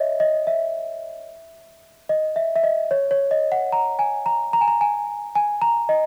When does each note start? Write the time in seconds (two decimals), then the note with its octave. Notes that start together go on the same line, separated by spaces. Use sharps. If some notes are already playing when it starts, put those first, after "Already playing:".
Already playing: C#5 D#5 E5
0.20 D#5
0.47 E5
2.09 D#5
2.36 E5
2.56 E5
2.64 D#5
2.91 C#5
3.11 C#5
3.31 D#5
3.52 F#5
3.72 A#5
3.99 G#5
4.26 A#5
4.53 A#5
4.61 G#5
4.68 A#5
4.81 G#5
5.35 G#5
5.62 A#5
5.89 D#5